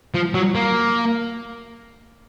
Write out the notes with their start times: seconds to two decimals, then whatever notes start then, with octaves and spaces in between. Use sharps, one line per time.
0.14 F3
0.34 F#3
0.55 A#3